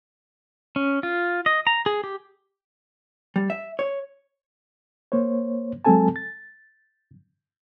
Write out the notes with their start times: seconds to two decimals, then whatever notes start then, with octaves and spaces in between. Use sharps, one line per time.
0.76 C#4
1.03 F4
1.46 D#5
1.67 A#5
1.86 G#4
2.04 G4
3.36 G3
3.50 E5
3.79 C#5
5.12 A#3 C5 C#5
5.85 F#3 G#3 C4 A4 G#5 A5
6.16 A6